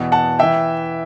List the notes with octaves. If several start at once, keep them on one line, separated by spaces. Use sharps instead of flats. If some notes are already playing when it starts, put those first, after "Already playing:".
Already playing: E2 B2
F#5 A5
E3 E5 G5